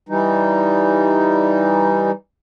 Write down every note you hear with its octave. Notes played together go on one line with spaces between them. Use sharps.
E3 G3 D#4